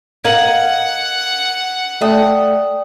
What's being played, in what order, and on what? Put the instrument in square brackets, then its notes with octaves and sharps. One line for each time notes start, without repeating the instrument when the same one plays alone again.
[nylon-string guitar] A#4 D#5 F5 [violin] F#5 [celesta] G#6 F#7
[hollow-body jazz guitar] A3 [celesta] D5 G5 D#6